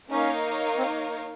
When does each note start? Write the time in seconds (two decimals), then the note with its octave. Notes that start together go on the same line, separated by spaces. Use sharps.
0.10 A#3 C#4 D#4 A#4 C#5 F5
0.78 C4